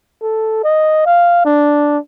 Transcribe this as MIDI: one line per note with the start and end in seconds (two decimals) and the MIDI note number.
0.22 0.60 69
0.64 1.04 75
1.06 1.45 77
1.45 1.98 62